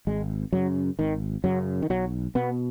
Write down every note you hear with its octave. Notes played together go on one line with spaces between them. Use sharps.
G#1 G#3
F#2 C#3 F#3
G#1 D#3
F#2 C#3 F#3
D#3
B1 F#3
B2 B3